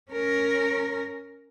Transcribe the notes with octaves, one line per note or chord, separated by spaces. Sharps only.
C#4 A#4